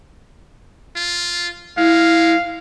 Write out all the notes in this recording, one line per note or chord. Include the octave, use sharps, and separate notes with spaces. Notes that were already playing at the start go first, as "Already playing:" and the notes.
F4
G#3 E4 F5